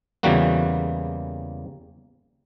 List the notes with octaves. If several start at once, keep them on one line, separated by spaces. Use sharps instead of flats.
E2 C#3 E3 G3 A#3 F#4